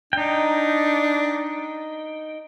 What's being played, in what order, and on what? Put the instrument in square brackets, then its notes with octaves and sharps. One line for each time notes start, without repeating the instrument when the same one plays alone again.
[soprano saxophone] D4 [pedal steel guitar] D#4 G5